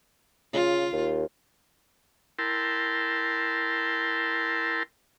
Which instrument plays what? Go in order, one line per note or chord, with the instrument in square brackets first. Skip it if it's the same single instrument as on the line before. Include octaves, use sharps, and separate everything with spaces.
[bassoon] C#3 [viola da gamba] F4
[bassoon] D#2
[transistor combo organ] E4 A#4 G5 A5 C6